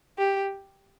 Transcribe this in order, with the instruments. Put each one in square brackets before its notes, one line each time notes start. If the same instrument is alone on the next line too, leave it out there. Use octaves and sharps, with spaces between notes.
[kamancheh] G4